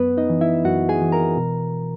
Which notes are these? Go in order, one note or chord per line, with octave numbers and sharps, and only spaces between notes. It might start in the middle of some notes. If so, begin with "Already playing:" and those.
Already playing: F#2 B3 B4
D#4 D#5
E3
E4 E5
F#2 F#4 F#5
G#4 G#5
E3
A#4 A#5
B2